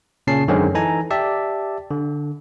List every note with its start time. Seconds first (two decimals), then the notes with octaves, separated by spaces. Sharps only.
0.27 A#2 C#3 C#4 A5 C7
0.48 F#2 D3 D#3 G#3 C4 C#4
0.75 E3 D#4 A4 G#5 A#5
1.11 G4 D5 E5 A5
1.90 D3